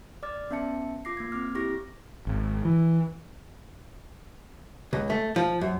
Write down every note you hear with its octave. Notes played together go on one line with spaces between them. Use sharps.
D5 D6 F6 A6
B3 C#4 E5 A5 C#7
F4 D6 A#6 C7
A#3 G#6
C4 D6 F6
E4 G4 C#6 A#6
G#1
E3
C#2
A3
F3
F#2